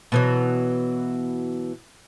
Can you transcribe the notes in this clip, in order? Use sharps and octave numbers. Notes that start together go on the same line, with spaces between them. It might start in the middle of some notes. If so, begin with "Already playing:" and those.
B2 E3 F#3